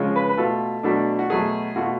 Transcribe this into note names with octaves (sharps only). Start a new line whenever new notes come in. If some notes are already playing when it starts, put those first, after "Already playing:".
Already playing: C#3 F3 G#3 C#4 F4
B4
B4
B2 A3 F4 A4
B2 F#3 A3 D4
F#4
B2 F#3 A3 G#4
B2 A3 F4 F#4